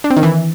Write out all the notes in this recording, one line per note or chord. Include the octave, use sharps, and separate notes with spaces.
D4
C4
D#3
E3